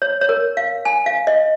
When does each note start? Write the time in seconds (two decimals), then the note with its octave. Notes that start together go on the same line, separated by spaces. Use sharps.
0.02 C#5
0.21 C#5
0.29 A#4
0.57 F5
0.85 G#5
1.06 F5
1.27 D#5